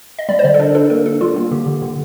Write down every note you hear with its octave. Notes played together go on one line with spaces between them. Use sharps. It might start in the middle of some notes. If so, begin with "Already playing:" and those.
D#5
G3 D5
C5
D3 D5
A4
D4 A#4
D4 A4
A#3 A#4
D4 A4
G3 F4
A#3
D3 G4
D3
D3